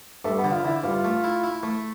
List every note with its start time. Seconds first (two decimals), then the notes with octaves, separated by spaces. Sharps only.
0.25 G2 A3
0.38 B3
0.44 D3
0.52 F4
0.64 D3 E4
0.84 G2 F4
1.04 A3
1.24 E4
1.43 E4
1.63 A3